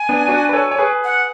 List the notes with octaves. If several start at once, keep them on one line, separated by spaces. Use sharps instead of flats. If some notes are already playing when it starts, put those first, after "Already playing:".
Already playing: G#5
B3 D4
D4 F#4
B4
A4 C#5
C#5
G#4 B4
F#5